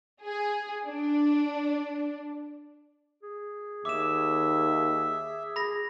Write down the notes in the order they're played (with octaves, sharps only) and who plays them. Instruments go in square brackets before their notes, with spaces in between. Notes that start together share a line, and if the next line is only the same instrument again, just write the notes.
[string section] G#4
D4
[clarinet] G#4
[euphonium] D#2 [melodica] E5 [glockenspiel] D6 E7
[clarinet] G#4 [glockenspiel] B5 A#6